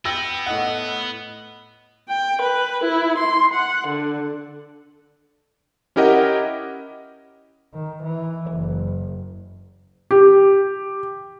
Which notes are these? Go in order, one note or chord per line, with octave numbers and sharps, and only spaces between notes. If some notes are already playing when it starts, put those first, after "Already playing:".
B3 G5 E6 A#6
A2 D#5 F#5
G5
B4
E4
C6
F#5
D3
C#4 E4 G4 A#4 D#5 F#5
D#3
E3
F#1
G4